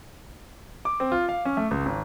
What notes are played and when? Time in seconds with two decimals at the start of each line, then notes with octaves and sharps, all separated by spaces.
0.85 D6
1.00 C4
1.12 F4
1.29 F5
1.45 C#4
1.57 A3
1.71 C#2
1.86 G#1